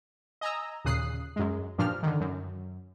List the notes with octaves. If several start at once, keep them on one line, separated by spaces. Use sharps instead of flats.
D#5 G#5 A#5 E6
D#2 A#2 C#3 D#6 F#6 C7
F#2 G#3
G2 A#2 F3 D4 F6
D3 D#3
F#2